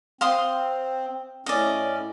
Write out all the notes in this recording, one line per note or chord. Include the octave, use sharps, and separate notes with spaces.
C4 F5 C6 D#6
A2 C#4 D5 D#5